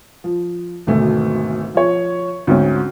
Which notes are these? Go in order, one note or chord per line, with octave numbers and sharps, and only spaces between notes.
F3
G#1 D2 B2 A3
F3 C#5
D2 G#2 C4 C#4